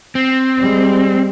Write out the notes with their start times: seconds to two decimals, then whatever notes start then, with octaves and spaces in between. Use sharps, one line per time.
0.15 C4
0.58 G3 G#3